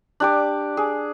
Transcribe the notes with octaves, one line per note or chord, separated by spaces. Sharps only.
D4 G4 D6
G#4